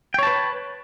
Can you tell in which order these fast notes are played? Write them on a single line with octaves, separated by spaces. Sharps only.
G5 C#5 A5 B4